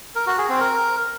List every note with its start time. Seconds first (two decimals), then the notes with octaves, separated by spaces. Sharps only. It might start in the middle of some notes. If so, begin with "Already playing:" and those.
0.16 A#4
0.27 F#4
0.38 G#4
0.49 C4
0.61 A#4